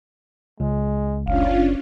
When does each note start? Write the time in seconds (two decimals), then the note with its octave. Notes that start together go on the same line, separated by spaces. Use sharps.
0.60 C#2 G#3
1.27 F#1 C#4 D4 F4 F5